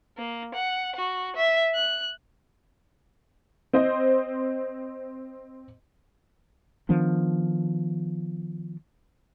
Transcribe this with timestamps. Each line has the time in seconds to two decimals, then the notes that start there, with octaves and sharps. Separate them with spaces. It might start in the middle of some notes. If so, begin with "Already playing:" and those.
0.17 A#3
0.54 F#5
0.96 F#4
1.36 E5
1.75 F#6
3.73 C4 C5 D#5
6.89 D#3 F3 B3 D4